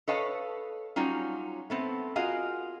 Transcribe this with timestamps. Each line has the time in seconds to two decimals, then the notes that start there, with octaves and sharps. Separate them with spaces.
0.08 A4 B4 C#5 D#5 F5 A5
0.96 F#3 G3 C#4 D#4 F4
1.70 A3 B3 C4
2.16 F4 F#4 G#4 A#4 D#5 F5